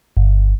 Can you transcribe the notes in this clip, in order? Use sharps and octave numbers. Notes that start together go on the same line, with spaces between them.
G1